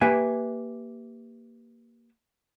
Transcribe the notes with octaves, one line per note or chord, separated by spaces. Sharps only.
A#3 G4 B4 E5 G#5